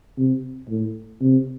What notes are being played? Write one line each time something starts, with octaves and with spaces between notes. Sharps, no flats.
C3
A2
C3